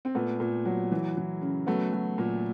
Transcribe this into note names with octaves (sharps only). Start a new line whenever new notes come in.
C4
A#2 A3 B3
A#2
F#3
E3
E3
C#3
F#3 A3 B3
F#3
A#2